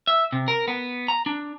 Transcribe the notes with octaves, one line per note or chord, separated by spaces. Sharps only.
E5
C3
A#4
B3
A#5
D4